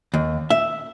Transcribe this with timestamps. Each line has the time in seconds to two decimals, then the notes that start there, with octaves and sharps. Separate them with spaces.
0.14 D#2
0.50 E5